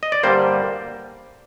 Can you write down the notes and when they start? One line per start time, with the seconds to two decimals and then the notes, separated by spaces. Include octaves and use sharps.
0.03 D#5
0.12 D5
0.23 G2 D3 G3 A#3 C5